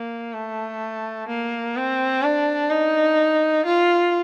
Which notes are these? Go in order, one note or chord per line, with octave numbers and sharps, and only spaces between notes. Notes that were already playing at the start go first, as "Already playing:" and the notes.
Already playing: A#3
A3
A#3
C4
D4
D#4
F4